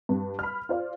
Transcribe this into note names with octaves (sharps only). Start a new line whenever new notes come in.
G2 G3
B5 F6
F4 C5 D5 F5